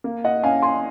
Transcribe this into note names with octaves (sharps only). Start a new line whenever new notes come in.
A#3
D#5 F#5
C#4 F5 G#5
G#5 C6